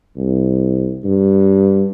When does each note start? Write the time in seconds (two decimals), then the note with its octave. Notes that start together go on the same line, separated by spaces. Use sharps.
0.17 C2
1.04 G2